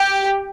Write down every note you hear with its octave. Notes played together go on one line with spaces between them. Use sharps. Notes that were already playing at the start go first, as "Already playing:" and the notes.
Already playing: G4